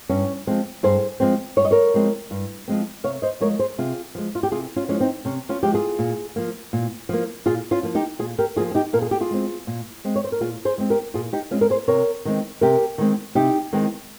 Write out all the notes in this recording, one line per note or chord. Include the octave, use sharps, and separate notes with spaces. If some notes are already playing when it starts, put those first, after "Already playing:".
G2 C#4
F3 G#3 C4
G2 G#4 C5
F3 G#3 C4
G2 C#5
D#5
A#4 C#5
F3 G#3 C4
G2
F3 G#3 C4
C3 C#5 F5
C5 D#5
F3 G#3 A#4 C#5
G#4 C5
C3 F4 G#4
F3 G#3
F4
G4
C3 F4 G#4
C#4 F4
F3 G#3 C#4
C4 D#4
C3 C#4
C#4 F4
F3 G#3 G4
F4 G#4
A#2
F3 A#3
A#2
F3 A#3
A#2 F4 G#4
C#4 F4
F3 A#3
D#4 G4
A#2 F4 G#4
G4 A#4
F3 A#3 F4 G#4
G#4
D#4 G4
A#2 A#4
G#4
G4
F4 G#4
G#3 C4
A#2
G#3 C4
C#5
C5
A#4
A#2 F4 G#4
G#4 C5
G#3 C4
G4 A#4
A#2 F4 G#4
D#4 G4
G#3 C4 C#4 F4
A#4
G#4 C5
C3 A#4 C#5
D#3 G#3 C4
C3 G4 A#4
D#3 G#3 C4
C3 D#4 G4
D#3 G#3 C4